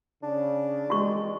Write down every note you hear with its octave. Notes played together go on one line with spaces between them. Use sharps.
C#3 D4
G#1 E3 G3 G#3 F#4 C#6